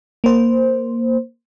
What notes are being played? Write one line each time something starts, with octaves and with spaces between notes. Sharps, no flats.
A#3 C5